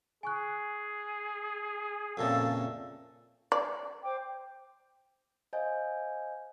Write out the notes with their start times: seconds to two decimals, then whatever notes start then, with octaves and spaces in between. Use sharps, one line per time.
0.23 G#4 G#5 C#6 F#6
2.17 F2 A#2 C#3 A4 E5 G5
3.52 D5
4.03 C5 G5 D6
5.53 C5 D#5 F5 G#5 G6